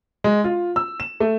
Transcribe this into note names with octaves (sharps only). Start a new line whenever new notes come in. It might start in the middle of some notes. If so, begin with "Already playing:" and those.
G#3
F4
E6
E7
A3